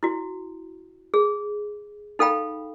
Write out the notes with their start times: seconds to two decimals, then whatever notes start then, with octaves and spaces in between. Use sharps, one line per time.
0.03 E4 F#4
1.14 G#4
2.19 D#4 A4 F5 G5 B5